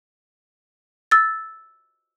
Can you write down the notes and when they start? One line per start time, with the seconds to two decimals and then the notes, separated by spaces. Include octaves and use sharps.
1.11 E6 A6